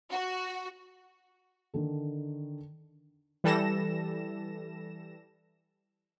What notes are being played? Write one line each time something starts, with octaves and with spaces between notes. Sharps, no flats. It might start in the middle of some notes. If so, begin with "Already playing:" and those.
F#4
D3 D#3 A4
E3 G3 A4 A#6 E7